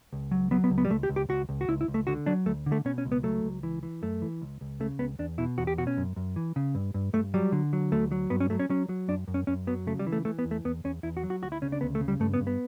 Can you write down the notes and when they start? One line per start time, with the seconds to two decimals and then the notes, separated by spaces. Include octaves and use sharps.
0.13 C#2
0.31 F#3
0.51 F#3 B3
0.64 B3
0.70 C#2
0.78 B3
0.85 G3
0.90 C#2 A3
1.03 G4
1.09 C#2
1.16 G4
1.29 C#2 F#4
1.49 C#2
1.61 F#4
1.68 C#2 E4
1.81 E4
1.88 C#2
1.94 A3
2.07 D3 F#4
2.26 F#3 D4
2.46 D2 A3
2.66 D3
2.72 A3
2.85 B2 C#4
2.98 C#4
3.05 C#2
3.12 B3
3.23 F#3 A3
3.44 C#2
3.63 E3
3.83 E3
4.02 F#2 A3
4.22 E3
4.42 C#2
4.61 C#2
4.80 C#3 A3
4.99 C#2 B3
5.19 E2 D4
5.38 B2 E4
5.58 E2 F#4
5.67 G4
5.78 B2 F#4
5.87 C#4
5.97 F#2
6.16 F#2
6.36 E3
6.56 C#3
6.75 G2
6.94 G2
7.13 G2 A3
7.34 F#3 G3
7.52 D3
7.73 F#3
7.92 D2 A3
8.12 F#3
8.30 G2 B3
8.40 C#4
8.50 F#3 A3
8.59 C#4
8.70 F#3 C#4
8.89 F#3
9.08 F#2 D4
9.28 F#2
9.34 C#4
9.47 F#2 C#4
9.67 F#3 B3
9.87 C#3 A3
9.99 G3
10.07 E3
10.12 A3
10.25 E3 A3
10.39 B3
10.45 E2
10.51 A3
10.65 E2 B3
10.84 E2 C#4
11.03 E2 E4
11.17 F#4
11.23 F#3
11.30 F#4
11.42 D2 F#4
11.52 E4
11.62 C#3 C#4
11.72 D4
11.81 D2 B3
11.95 A3
12.01 C#3
12.08 G3
12.20 G2 A3
12.34 B3
12.40 G2
12.47 B3